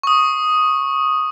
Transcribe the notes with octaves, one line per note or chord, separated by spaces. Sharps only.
C#6 D#6